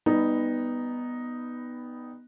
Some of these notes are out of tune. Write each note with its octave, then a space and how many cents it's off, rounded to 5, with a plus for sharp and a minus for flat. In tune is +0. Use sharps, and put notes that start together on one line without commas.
G3 +20 B3 +0 D#4 +0